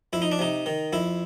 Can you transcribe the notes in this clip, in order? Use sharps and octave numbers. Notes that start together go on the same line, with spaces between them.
F2 E4
D#4
D4
C3 D#4
D#3
F2 E4